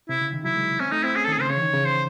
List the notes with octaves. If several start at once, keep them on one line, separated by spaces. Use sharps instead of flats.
C3 E4
C#3
D#3
F#3 E4
G#3
C4 C#4
A3 D#4
C4 E4
C#4 G#4
D#3 A4
G#4
C#3
C5
C#3 C#5
E3
D#3
C#3
C5